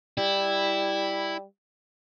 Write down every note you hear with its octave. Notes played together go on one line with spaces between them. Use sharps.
G3 E4